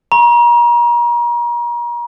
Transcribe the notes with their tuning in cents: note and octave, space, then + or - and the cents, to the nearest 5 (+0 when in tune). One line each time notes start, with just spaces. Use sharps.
A#5 +35 C#6 -40